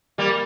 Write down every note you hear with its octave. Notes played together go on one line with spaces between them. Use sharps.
G3 A#3